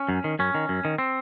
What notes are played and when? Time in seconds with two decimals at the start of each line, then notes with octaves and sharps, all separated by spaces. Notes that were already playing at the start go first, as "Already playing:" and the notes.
Already playing: C#4
0.09 F#2
0.24 D#3
0.39 F#2 C#4
0.55 D#3
0.69 F#2
0.85 D#3
0.98 C4